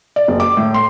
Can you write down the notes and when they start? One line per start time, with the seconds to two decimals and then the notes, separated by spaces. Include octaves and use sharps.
0.16 D5
0.28 F#1
0.40 D6
0.57 A2
0.74 C6